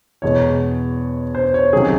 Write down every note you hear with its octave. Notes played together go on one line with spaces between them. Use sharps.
E2 B2 G#3 C#5
C5
C#5
C#2 C3 D#3 F#3 G#4